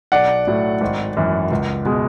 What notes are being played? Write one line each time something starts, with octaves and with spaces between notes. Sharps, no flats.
B1 D5 F#5
A2 F#3
G#1
F#2 E3
C#2
B2 G#3